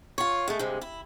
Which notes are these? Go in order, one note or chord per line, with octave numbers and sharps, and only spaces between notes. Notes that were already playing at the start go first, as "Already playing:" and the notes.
F4 C#5
G#3 A3
G2 C3 G#3
E4